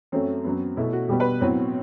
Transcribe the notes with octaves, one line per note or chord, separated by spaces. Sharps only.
F#2 F#3 A3 C4
F#2 F#3 B3
B2 A3 E4
F#4
B2 G3 B3 G4
B4
A2 F#3 B3 C4